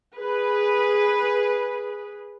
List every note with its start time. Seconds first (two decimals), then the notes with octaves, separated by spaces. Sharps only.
0.18 G#4 B4